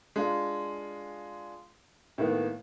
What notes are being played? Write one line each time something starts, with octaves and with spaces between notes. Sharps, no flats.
G#3 D4 F4
A2 D#3 A#3 B3